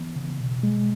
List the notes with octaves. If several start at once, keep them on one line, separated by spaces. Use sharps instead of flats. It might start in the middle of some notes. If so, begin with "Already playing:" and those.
Already playing: E3 B3
C#3
B2
G#3